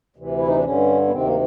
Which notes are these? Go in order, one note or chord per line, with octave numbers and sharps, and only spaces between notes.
D2 C3 E3
E4
D#4
D4
G2 D3 C#4
B3
D2 C3 D#3 C4
A#3